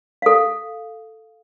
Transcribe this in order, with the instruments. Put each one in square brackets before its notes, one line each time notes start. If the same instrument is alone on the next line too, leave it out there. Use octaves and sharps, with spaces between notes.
[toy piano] A4 F5